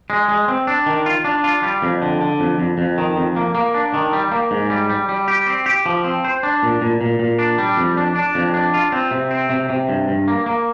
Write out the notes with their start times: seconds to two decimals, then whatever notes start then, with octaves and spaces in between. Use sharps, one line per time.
0.10 G#3
0.28 G#3
0.48 C4
0.67 D4
0.86 D#3
1.06 F4
1.24 D4
1.44 F4
1.63 G3
1.82 F2
2.02 D3
2.21 D3
2.40 F2
2.58 F2
2.78 F2
2.98 D#3
3.17 F2
3.36 A#3
3.55 A#3
3.74 D4
3.94 D#3
4.13 G3
4.31 A#3
4.51 G#2
4.70 G3
4.90 G3
5.09 G3
5.28 G4
5.46 C4
5.66 G4
5.86 F3
6.04 C4
6.24 C5
6.43 D4
6.63 A#2
6.81 A#2
7.01 A#2
7.19 A#2
7.39 D4
7.58 G3
7.77 F2
7.97 D4
8.16 D4
8.35 F2
8.54 D4
8.74 F4
8.92 C4
9.11 C3
9.31 C4
9.50 C3
9.70 C3
9.89 G2
10.08 G2
10.28 A#3
10.46 A#3